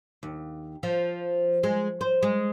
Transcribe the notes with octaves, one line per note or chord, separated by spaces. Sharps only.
D#2
F3
G#3
C5
G#3